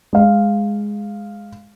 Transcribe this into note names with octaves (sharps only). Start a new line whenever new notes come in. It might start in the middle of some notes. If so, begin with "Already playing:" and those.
G#3 F5